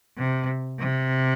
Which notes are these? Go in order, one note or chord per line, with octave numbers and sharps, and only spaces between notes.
C3
C3